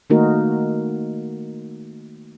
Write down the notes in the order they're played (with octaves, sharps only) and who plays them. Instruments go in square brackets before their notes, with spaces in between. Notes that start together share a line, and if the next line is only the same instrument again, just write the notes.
[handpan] D#3 A3 A#3 D#4 F#4 A#4